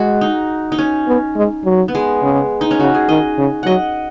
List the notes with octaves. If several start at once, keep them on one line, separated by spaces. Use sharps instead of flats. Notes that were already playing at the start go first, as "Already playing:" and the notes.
Already playing: G#3 F#4 G#4
D#4
D#4
C#4
B3
G#3
F#3
B3
G#3
C#3
D#4
C#4
C#3 F#4
G#4
D#3 D#5
C#3
F#3 D#5 F#5